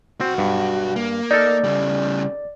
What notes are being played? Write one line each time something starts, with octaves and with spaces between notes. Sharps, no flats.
B1 C4 F#4
G2
A#3
D#4 A4 D5
C#3 G3